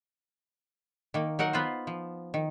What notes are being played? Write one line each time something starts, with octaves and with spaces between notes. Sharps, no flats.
D#3 A#3
F#3 D#4 A#4 F#5
B3 F4 B4 C5
F3
D#3